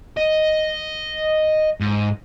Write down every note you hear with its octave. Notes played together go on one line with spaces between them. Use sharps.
D#5
G#2